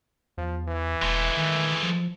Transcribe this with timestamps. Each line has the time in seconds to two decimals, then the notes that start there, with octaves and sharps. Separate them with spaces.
0.37 E2 F3
0.68 E3
1.02 E1 G#3 A3
1.37 D#3
1.83 F3